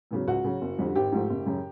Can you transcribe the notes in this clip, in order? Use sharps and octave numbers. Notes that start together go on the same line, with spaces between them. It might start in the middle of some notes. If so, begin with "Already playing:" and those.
E2 C#3 F#3
C#2 F#4
C#3 F#3
F#1
F2 D3 G3
G#1 G4
G#2 F3 A3
F#1
F#2 C#3